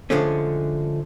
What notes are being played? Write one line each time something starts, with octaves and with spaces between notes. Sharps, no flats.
D3 F3 G#3 A3 C#4